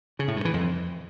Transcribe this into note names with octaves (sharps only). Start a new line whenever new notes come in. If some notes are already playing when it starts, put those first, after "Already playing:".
C#3
A2
G2
E3
F2